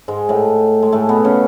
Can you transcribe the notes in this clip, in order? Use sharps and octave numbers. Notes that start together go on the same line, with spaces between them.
G#2 G#3
A2 A3
G#3
A2 A3
B2 B3
C#3 C#4